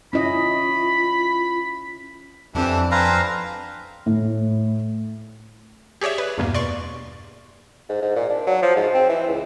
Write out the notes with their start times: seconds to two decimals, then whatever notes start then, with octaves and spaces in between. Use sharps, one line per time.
0.13 C#4 E4 F4 D#5 B5
2.55 F2 E3 D4 G4 A5
2.91 C4 B4 F5 G#5 A#5 C6
4.06 A2
6.01 G4 G#4 C#5 D5 E5
6.18 B4
6.38 E2 G2 B2 A#3
6.54 D5 C6 C#6
7.89 G#2
8.02 G#2
8.16 A#2
8.30 D4
8.47 F#3
8.62 F3
8.76 G#2
8.94 C4
9.09 E3
9.27 C#2